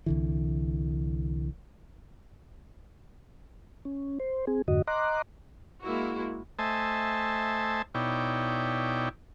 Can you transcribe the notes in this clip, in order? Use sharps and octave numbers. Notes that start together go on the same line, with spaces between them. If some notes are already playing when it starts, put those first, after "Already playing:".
C2 D3 E3
C#4
C5
C4 G#4
F2 G#2 D3 F#4 D#5
D#5 A#5 C6 D6 F#6
G#3 A#3 E4 F#4
A3 C5 D#5 E5 G#5 A5
B2 D#4 E4 C#5 D5 G5